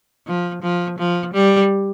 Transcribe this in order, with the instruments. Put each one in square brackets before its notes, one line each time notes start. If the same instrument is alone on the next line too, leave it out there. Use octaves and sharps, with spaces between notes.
[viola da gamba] F3
F3
F3
G3